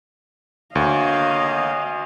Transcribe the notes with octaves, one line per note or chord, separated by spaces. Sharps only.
D2 A#3 C#5 D#5 F5